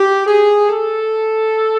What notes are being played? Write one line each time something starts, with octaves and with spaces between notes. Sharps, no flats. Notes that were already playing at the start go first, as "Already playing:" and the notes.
Already playing: G4
G#4
A4